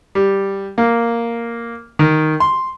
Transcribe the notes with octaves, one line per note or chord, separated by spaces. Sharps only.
G3
A#3
D#3
C6